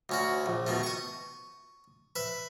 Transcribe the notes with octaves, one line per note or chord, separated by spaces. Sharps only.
D2 C#4 F#4
A#1
B2 D#3 A3
C#6 D#6
B4 E5